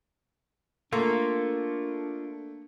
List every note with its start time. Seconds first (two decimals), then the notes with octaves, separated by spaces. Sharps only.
0.92 A3 A#3 D4 F4 A4 C6